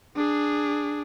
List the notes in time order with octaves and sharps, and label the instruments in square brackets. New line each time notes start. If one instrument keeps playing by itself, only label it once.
[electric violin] D4 G#4